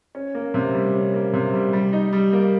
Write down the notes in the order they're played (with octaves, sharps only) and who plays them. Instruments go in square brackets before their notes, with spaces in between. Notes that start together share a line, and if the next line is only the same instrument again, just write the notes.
[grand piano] C#4
A#3
C3
G3
C#4
A#3
C3
G3
G3
D#4
G3
A#3